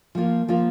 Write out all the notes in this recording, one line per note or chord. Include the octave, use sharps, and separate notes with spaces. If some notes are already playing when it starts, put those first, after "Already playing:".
F3 A#3 F4
F3 A#3 F4